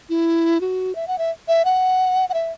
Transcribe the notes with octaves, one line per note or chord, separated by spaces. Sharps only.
E4
F#4
E5
F#5
E5
E5
F#5
F#5
E5